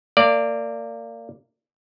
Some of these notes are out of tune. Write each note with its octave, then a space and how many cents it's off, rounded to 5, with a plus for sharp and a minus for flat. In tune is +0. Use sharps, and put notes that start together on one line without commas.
A#3 -30 D5 +0